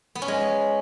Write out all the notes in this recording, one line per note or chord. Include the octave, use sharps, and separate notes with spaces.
B3
C#4
G#3